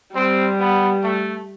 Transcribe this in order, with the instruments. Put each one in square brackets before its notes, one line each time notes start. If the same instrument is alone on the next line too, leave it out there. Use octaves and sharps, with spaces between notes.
[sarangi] G3 [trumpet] C4
[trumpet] B3
A3